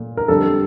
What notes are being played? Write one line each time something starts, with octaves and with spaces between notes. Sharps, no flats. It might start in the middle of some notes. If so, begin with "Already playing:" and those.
Already playing: A#2 A3
A#4
F2 D3 G3 A4